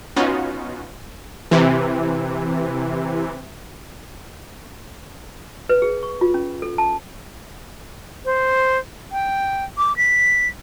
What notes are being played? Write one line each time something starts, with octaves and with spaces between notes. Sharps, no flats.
B3 C#4 D#4 F4 F#4
C3 E3
B4
G#4
C#6
F4
C#4
A4
A5
C5
G5
D6
B6